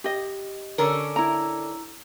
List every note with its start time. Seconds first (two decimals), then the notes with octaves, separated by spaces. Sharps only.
0.04 G4 D#5
0.78 D3 C#4 A#4
1.16 E4 A#5